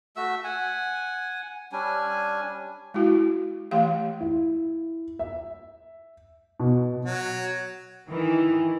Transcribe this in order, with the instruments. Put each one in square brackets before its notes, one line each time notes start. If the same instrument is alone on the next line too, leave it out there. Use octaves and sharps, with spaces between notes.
[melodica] A3 F#4 E5 E6
F#5 G#5
G3 C#4 D4 G#5
[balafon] G#3 E4 F#4
E3 A3 G4 F5
[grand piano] E4
E5
B2
[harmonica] F#3
[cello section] D#3 E3